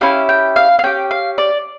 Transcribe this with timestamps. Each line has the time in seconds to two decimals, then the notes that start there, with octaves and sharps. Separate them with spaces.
0.01 C#4 E4 G4 F5
0.29 G5
0.56 F5
0.79 F5
0.84 C#4 G4 G5
1.11 F5
1.38 D5